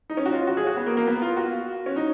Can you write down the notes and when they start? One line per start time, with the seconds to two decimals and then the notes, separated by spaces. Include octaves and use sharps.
0.10 D#4
0.17 C#4
0.26 F#4
0.32 F4
0.47 F#4
0.57 G#4
0.67 F#4
0.77 B3
0.86 A#3
0.97 A#3
1.07 B3
1.22 F4
1.37 F#4
1.86 C#4
1.96 D#4